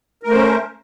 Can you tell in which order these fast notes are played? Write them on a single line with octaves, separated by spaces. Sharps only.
A#4 A3 C5 C#4